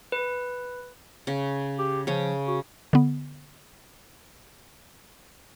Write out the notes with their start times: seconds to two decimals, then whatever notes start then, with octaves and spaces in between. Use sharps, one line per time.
0.12 B4
1.27 C#3
1.78 G4
2.07 C#3 F3 C#4
2.48 F#4
2.93 D3 B3